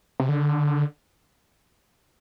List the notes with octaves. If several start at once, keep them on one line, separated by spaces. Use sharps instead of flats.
C3
D3